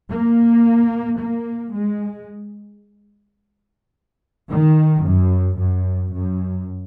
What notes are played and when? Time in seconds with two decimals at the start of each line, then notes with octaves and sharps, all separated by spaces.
0.10 A#3
1.19 A#3
1.74 G#3
4.49 D#3
5.03 F#2
5.58 F#2
6.12 F#2